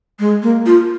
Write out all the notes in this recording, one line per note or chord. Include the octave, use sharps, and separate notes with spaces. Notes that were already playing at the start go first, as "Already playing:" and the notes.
G#3
A#3
F4